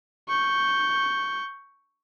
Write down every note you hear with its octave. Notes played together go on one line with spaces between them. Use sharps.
C#6 G6